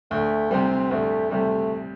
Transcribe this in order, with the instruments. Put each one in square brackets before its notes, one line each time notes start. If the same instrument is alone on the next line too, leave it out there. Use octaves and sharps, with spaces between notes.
[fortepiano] D2 [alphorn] A3
[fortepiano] C3 G3 [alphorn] C4
[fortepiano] D2 [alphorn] A3
[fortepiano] C3 G3 [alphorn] A3